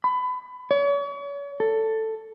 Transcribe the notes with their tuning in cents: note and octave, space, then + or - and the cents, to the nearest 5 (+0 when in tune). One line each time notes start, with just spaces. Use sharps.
B5 +25
C#5 +40
A4 +10